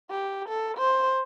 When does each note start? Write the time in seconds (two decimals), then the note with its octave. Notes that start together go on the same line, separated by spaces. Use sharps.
0.10 G4
0.49 A4
0.77 C5